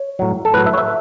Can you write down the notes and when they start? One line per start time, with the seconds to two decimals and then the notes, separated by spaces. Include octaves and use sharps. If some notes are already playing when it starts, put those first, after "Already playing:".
Already playing: C#5
0.19 A2 F#3
0.45 A4
0.54 A2 F#3 B4
0.66 E5
0.73 C#5
0.78 E5